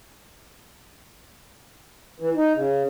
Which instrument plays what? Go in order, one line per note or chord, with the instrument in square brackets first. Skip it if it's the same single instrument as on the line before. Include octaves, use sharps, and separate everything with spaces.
[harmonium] E3
D#4
C#3